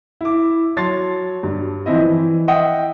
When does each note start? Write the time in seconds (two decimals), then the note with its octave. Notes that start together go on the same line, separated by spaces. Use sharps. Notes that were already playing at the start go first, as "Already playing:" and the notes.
0.21 E4 D6
0.77 F#3 C#5 A5 C6 A6 C7
1.43 G2
1.86 E3 F3 C4 E4 D#5
2.06 E3
2.48 D#5 E5 F#5 G5 D#6